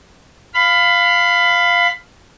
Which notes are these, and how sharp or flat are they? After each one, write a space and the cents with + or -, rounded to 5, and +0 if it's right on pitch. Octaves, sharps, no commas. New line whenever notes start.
F5 +0 B5 +20